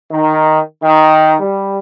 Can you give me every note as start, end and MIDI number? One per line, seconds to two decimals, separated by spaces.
0.11 0.59 51
0.82 1.34 51
1.40 1.78 55